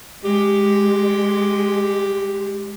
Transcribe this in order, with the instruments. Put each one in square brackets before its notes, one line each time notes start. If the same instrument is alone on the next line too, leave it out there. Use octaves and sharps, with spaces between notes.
[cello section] G#3 [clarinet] G4